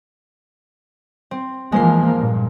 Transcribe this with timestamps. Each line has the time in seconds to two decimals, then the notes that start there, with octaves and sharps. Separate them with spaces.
1.31 C4
1.72 E3 F3 G#3 A#3 C5 C7
2.16 G2 A#2